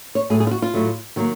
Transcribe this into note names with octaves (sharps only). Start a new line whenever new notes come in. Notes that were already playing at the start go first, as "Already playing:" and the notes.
C#5
A2 F#3 A3 G#4
G#4
F4
F#4
F4
A2 F#3 A3
D#3 F#3 A#3